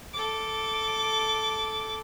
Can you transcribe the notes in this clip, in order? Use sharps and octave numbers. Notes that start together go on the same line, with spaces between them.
A4 D6